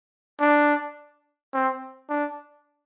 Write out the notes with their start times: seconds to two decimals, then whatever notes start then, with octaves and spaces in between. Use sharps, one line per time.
0.41 D4
1.54 C4
2.09 D4